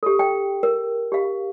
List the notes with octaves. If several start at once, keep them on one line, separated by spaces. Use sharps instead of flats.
G4 A4
G5
A#4
G4 F5